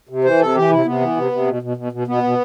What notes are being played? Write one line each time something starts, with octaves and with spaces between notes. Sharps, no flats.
C3
E3 C5
C3 A4
E3 G4
C3 E4
C3 B3
E3
C3
C3
B2
B2
B2
B2
B2 B3
B2